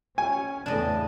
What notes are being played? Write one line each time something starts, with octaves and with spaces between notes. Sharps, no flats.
C#4 G#5
E2 A2 C#3 D4 D#5